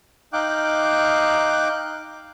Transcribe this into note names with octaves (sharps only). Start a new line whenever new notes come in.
D#4 F5 G5 D6 F#6